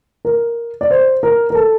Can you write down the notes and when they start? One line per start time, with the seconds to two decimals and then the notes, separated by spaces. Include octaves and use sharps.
0.25 A#4
0.81 D5
0.91 C5
1.23 A#4
1.50 A#4
1.55 A4